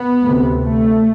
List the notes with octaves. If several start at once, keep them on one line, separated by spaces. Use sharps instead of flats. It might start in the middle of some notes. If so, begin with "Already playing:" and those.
Already playing: B3
D2 C3
A3